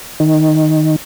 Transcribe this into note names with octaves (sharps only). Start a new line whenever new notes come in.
D#3